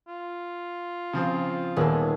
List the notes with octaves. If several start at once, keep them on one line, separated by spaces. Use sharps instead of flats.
F4
C#3 F3 C4
D#1 A#3 B3 G#4 A4